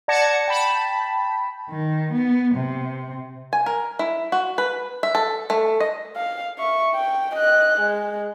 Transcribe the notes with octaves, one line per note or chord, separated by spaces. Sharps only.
D5 F#5 A5 G#6 A#6 C#7
G5 A5 B5
D#3
B3
C3
G#5
A#4
E4
F#4
B4
E5
A4
A3
D#5
F5
E5 C#6
G5
D#5 F#6
G#3